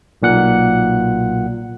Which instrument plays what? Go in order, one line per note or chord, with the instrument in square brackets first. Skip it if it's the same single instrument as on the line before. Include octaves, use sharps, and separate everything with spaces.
[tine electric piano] B1 A#2 F#5 F#6